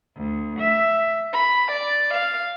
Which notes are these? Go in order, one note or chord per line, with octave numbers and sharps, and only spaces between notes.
D2
E5
B5
D5
F5